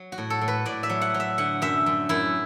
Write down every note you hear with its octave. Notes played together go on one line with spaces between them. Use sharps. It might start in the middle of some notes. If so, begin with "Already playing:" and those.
Already playing: F#3
F#4
A2
A4
A2
B4
A2 D5
E5
F#3
F#5
F#3
E5
D3 F#5
F#2 E5
F#2
F#2 E4